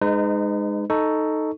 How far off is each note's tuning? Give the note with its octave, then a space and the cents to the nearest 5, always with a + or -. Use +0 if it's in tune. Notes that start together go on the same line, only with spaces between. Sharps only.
G#3 +0 D#4 -25 B4 +40
D#4 +0 A4 +0 C#6 +5